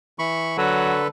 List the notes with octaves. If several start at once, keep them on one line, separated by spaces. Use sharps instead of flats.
E3 B5 C#6
D3 F#3 A4 B4